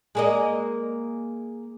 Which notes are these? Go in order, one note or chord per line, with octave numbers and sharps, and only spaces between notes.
G#3 A#3 D#5